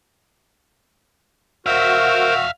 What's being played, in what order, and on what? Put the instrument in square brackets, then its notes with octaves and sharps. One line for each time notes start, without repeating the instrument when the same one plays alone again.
[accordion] F#4 E6 [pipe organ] A#4 C5 [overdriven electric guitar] E5 F5